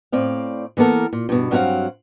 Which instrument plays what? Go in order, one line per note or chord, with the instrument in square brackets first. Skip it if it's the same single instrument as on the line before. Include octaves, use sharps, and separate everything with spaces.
[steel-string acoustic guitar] A2 C4 D5 F5
E3 A#3 B3 A4 A#4
A#2
G2 B2
G2 F#3 C4 A#4 F5 F#5